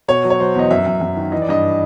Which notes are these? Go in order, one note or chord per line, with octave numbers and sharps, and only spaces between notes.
B2 C#5
F#3
C#5
F#3 C5
E2 D#5
F#2 E5
F#2
F#2
D#3
E3 D#5
D5
G2 D#5